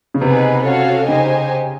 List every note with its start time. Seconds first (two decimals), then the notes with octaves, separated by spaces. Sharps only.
0.14 C#3
0.21 C3 B3 D#4 G#4 B4
0.66 C#4 F#4 A4 C#5 F5
1.08 C#3 D#4 G4 C5 D#5 G#5